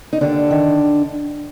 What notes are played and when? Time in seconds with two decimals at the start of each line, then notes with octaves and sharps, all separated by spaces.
0.13 D#4
0.21 D#2 D3 D4
0.51 D#3